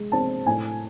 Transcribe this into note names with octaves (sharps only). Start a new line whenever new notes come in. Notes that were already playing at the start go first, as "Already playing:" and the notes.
Already playing: G#3
C4 A5
A2 G#5